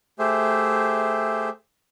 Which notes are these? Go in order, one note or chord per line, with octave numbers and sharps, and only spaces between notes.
A3 G4 G#4 C5 E5